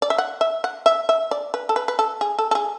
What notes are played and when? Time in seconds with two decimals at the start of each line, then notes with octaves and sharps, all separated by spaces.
0.02 D5
0.10 E5
0.18 F#5
0.41 E5
0.64 F#5
0.86 E5
1.09 E5
1.31 D5
1.54 B4
1.69 A4
1.76 B4
1.88 B4
1.99 A4
2.21 G#4
2.39 A4
2.51 A4
2.55 G#4